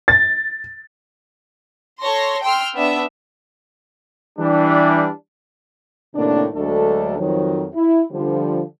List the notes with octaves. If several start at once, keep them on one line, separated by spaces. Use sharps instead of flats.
A6
A4 C#5 C6 A#6
G5 C6 E6 F6
B3 D4 E5
E3 G3 D4
A2 C3 D#3 A#3 D4
D2 F#3 G#3 A3 D4 A4
F2 D#3 F3 F#3
E4
D3 F3 G3